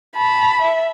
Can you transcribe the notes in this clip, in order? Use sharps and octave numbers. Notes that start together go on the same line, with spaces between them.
A5 B5
E5